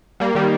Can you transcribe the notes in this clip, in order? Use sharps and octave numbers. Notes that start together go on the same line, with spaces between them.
G3 A#3
D#3 G3